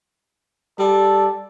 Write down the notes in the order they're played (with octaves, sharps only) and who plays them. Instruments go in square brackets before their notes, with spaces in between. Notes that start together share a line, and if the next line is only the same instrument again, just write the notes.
[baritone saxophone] G3 [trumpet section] A4 D5